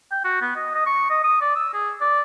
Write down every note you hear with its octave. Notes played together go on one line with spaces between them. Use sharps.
G5
F#4
B3
D#5
D#5
C#6
D#5
D#6
D5
E6
G#4
D5